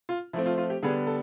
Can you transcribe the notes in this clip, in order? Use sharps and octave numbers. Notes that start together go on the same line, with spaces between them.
F4
F3 A3 C4 E4
F4
F4
G4
D3 G3 B3 D4 G#4
A4